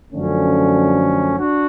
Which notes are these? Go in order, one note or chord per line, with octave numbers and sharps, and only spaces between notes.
F#2 D3 F3 A3 C#4
D4 F#4